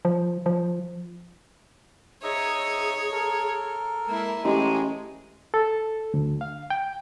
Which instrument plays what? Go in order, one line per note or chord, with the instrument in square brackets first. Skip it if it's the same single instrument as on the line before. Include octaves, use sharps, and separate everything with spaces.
[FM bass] F3
F3
[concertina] D#4 E5 D#6 [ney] G#4 [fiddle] C#5
[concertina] A4 A#4
[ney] G#3 [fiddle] A#3 E4
[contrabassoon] A1 [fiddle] G#3 [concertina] D#4 [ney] G4
[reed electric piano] A4
D2
F5
G5